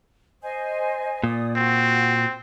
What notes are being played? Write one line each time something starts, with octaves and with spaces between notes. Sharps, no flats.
C5 D#5 G#5
A#2 D5 D#6
C4 F#4